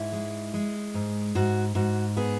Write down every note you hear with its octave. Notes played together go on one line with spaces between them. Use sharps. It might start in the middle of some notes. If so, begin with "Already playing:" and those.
Already playing: G#2 E4
G#3
G#3
G#2
G#2 F#4
G#2 F#4
B3 G#4